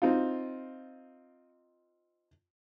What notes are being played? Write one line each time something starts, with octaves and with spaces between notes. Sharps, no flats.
C4 D#4 F4